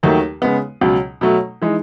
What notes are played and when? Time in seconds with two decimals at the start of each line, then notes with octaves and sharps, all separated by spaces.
0.03 D#2 D#3 F#3 A3
0.42 C#3 G#3 B3
0.81 C#2 B2 F#3
1.21 B2 F#3 A3
1.62 E3 G#3 D#4